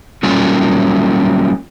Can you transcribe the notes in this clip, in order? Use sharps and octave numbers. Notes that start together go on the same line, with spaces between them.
F#3 G3 A#3 C#4 F4